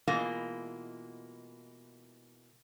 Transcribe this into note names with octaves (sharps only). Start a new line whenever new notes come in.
B2 E3 G#3 A#3 F4